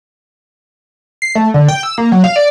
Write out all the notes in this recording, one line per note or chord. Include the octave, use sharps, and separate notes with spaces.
C7
A3
D3
G5
E6
A#3
F#3
F5
D5